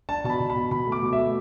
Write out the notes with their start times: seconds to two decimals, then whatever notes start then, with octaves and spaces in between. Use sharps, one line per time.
0.09 D4 A5
0.24 B2 A5
0.30 B5
0.40 B2
0.50 B5
0.55 B2
0.71 B2 B5
0.87 A3
0.92 D6
1.02 B2
1.13 E5
1.18 A3